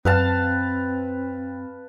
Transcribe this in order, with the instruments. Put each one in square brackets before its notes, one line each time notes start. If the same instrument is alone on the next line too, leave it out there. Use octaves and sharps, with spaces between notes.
[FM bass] F#2 [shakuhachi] C4 [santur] B4 F5 A5